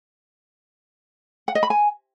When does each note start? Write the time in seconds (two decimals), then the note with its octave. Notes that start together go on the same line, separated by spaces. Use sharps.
1.48 F#5
1.55 D#5
1.63 B5
1.70 G#5